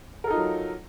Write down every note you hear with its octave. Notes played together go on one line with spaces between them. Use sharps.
F#3 D#4 F4 A4 A#4